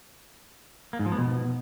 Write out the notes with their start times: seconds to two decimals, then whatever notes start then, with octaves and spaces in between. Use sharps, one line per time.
0.93 A#3
0.99 G#2
1.06 F3
1.12 B3
1.18 B2